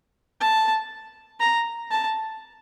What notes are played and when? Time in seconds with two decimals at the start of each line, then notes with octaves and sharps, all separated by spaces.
0.40 A5
1.40 A#5
1.91 A5